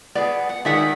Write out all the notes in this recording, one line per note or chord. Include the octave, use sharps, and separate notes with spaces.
B3 G#4 D5
F#5
D#3 G#3 D5 E5 F#5